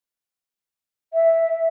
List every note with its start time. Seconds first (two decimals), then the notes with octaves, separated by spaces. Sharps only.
1.14 E5